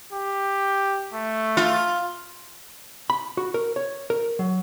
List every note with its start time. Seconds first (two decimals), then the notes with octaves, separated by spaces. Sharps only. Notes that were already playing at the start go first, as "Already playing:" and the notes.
0.13 G4
1.14 A3
1.57 F4
3.10 B5
3.37 F#4
3.54 A#4
3.76 C#5
4.10 A#4
4.39 F#3